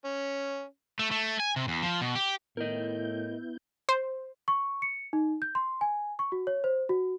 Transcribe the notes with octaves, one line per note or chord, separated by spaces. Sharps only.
C#4
A3
A3
G#5
C3
E2
F3
B2
G4
A2 B3 E4 A#4 D#5 G6
C5
C#6
C#7
D#4
G6
C6
G#5
C#6
F#4
C#5
C5
F#4